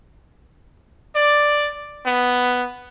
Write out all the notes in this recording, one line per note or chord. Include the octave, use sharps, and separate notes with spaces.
D5
B3